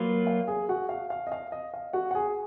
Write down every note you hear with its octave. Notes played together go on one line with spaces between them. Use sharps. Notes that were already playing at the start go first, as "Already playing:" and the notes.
Already playing: F#3 A#3 F4 B4
F5
G#4 G#5
F#4 F#5
F5
F5
D#5
F5
D#5
F5
F#4 F#5
F#5
G#4 G#5